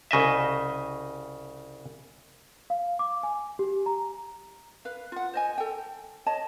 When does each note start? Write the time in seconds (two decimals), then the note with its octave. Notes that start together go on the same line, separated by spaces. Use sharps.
0.11 C2 C#3 D#5 E5
2.70 F5
2.99 D6
3.23 G#5
3.59 G4
3.86 A#5
4.85 B4 F5
5.12 F4 F#5
5.34 C5 D#5 G#5
5.58 A4 G5
6.26 C#5 D#5 A5